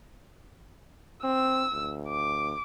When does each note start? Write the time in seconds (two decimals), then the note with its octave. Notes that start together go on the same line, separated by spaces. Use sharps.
1.24 C4 E6
1.73 D2
2.09 D6